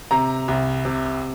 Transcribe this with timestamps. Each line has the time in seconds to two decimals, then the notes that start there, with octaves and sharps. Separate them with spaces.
0.11 C3 A#5
0.48 C2
0.85 C3